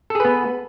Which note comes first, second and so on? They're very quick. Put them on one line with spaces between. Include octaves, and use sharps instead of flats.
A4 G#4 B4 B3